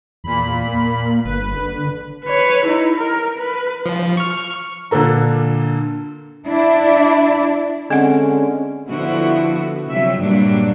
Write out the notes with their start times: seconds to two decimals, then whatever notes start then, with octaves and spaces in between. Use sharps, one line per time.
0.24 E2 A#2 B5
0.68 A#3
1.25 G1 B4
1.56 D3
2.25 B4 C#5
2.65 D#4 E4
2.96 A#4
3.38 B4
3.86 F3
4.17 C#6 F6
4.91 A#2 D3 D4 A4 A#5
6.48 D4 E4
7.90 D3 G#3 C4 C#4 F#5
8.88 D3 F3 B3 E4 F#4
9.88 C3 F3 F#3 E5
10.20 G2 A#2 F#3 G3 A#3 D4